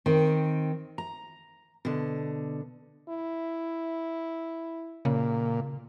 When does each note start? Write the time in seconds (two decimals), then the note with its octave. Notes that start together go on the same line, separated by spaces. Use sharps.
0.06 D#3 C4
0.98 A#5
1.85 B2 D3
3.09 E4
5.05 A#2 C#3